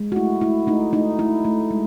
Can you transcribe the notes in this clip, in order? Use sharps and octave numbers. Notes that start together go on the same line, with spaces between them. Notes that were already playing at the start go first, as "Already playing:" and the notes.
Already playing: G#3
F#4
A3 E4
A3 E4
A3 D#4
A3 D#4
A3 E4
A3
G#3